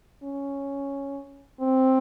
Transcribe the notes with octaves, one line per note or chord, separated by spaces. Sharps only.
C#4
C4